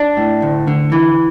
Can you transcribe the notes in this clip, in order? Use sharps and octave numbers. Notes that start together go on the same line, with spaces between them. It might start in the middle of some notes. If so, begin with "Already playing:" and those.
Already playing: D4
A2
D2
D3
E3